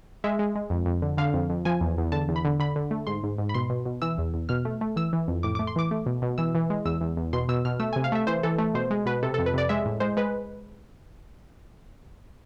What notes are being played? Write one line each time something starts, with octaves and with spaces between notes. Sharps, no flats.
G#3 E5
G#3
G#3
F2
F2
D3
D3 F5
F2
F2
F3 G#5
E2
E2
D3 A5
E2
B5
D3
D3 B5
D3
A3
G#2 C6
G#2
G#2
B5
B2 C6
B2
B2
E3 E6
E2
E2
B2 F6
A3
A3
E3 E6
E3
F2
A2 D6
D6
A3
C6
E3 D6
A3
B2
B2
E3 E6
E3
G#3
E2 E6
E2
E2
B2 C6
B2 E6
B2 F6
A3 E6
G#5
C3
F5
A3 E5
E3 C5
E3 A4
A3
B2 C5
G#3
B2 B4
C3 A4
A4
F2
B4
C3 D5
G#3 E5
A2
G#3 C5
G#3 B4